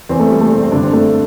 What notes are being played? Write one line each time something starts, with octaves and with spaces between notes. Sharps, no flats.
E2 E3 C4
A3
G3
A3
C4
C4
G2 D3 D4
C4
A3